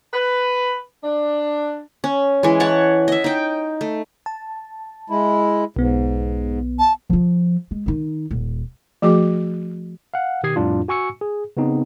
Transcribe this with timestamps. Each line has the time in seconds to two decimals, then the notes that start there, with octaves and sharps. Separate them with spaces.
0.12 B4
1.03 D4
2.04 C#4
2.43 E3 G#3
2.60 C#5 F#5 A5
3.08 D#5 E5
3.24 D#4 G5
3.81 A3
4.26 A5
5.10 G#3 E4
5.76 B1 G#2 B3
6.79 A5
7.10 F3 F4
7.71 G#3
7.86 D#3 D#4
8.31 D#1
9.02 F3 A3 F#4 G#4 D6
10.14 F5 F#5
10.43 B2 D#3 G4 D#6 G#6 C7
10.56 F2 A2 G3 D4 F4
10.88 F#4 G#5 C#6 E6 C#7
11.21 G#4
11.57 C#3 B3 C4 D#4